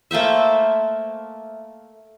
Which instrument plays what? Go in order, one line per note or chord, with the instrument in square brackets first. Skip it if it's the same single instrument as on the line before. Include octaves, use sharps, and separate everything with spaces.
[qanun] A3 A#3 C5 E5